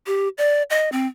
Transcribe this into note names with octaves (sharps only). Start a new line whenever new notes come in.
G4
D5
D#5
C4